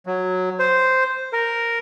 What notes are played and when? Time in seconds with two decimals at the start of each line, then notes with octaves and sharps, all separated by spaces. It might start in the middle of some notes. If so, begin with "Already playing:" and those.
0.06 F#3
0.59 C5
1.33 A#4